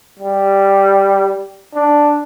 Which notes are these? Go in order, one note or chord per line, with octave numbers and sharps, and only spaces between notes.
G3
D4